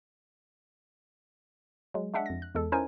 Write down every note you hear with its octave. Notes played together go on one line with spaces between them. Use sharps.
F#3 G#3
G#3 D4 E5 F#5
F2 A#6
F#6
E2 G#3 A4
C#4 D#4 E4 A#4 C5 G#5